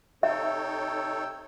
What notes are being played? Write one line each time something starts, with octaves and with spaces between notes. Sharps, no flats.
C3 D#4 A4 C#5 E5 G5 E6